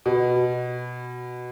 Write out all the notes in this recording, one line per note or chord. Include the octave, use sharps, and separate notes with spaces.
B2